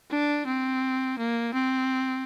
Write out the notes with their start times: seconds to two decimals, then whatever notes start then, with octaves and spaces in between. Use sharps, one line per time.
0.11 D4
0.47 C4
1.19 A#3
1.54 C4